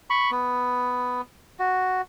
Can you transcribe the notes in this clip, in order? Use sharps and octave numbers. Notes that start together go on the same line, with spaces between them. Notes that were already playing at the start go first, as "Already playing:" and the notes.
B5 C#6
B3
F#4